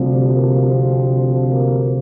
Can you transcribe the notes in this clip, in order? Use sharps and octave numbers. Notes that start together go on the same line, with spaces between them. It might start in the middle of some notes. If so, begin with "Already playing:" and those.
Already playing: D2 C3 F3 G3
A#3
C4
A#3